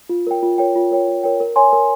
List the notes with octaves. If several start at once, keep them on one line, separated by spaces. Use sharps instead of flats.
F4
A#4 C#5 G5
F4
A#4 C#5 G5
F4
A#4 C#5 G5
F4
A#4 C#5 G5
A#4
C#5 G#5 C6
A#4